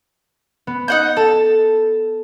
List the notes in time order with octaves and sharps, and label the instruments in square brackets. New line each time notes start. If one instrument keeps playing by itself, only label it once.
[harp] B3
[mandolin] D#4 F#5 G6
[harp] A4 [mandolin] A5